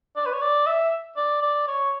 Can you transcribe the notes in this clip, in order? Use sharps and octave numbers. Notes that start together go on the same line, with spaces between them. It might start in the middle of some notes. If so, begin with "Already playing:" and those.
D5
B4
C#5
D5
E5
D5
D5
C#5